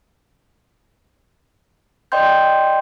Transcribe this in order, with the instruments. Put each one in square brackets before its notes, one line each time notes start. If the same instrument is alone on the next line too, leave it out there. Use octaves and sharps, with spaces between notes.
[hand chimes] D5 D#5 G5 C6 G6